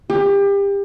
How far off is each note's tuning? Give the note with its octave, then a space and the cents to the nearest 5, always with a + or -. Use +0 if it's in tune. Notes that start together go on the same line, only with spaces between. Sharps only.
G4 +30